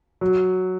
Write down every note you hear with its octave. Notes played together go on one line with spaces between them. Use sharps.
F#3